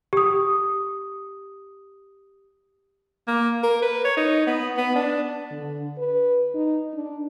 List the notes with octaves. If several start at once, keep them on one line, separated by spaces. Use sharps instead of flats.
G4 D#6
A#3
A#4
B4
C#5
D#4
B3
B3
D4
D3
B4
D#4
D4